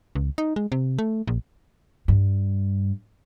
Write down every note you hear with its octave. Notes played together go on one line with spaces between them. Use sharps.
C#2
D#4
G#3
C3
A3
A#1
G2